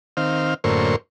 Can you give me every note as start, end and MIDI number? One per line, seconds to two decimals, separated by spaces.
0.17 0.54 51
0.17 0.54 60
0.17 0.54 77
0.64 0.96 42
0.64 0.96 45
0.64 0.96 50
0.64 0.96 58
0.64 0.96 72
0.64 0.96 85